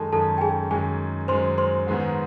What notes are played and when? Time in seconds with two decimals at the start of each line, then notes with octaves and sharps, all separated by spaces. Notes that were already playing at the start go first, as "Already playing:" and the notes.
Already playing: F#2 D#3 G#3 A4 A5
0.12 F#2 D#3 G#3 A4 A5
0.38 G5
0.41 G#4 G#5
0.70 F#2 D#3 G#3 G#4 G#5
1.28 F#2 D#3 G#3 C5 C6
1.58 C5 C6
1.87 G#2 D#3 G#3 B3